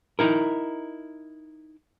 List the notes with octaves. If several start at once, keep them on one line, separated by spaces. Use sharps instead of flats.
D#4 E4 A#4